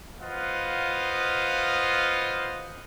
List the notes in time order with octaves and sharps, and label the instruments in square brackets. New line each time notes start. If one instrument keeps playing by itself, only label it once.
[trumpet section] F4 B4 C5 D#5 F5 F#5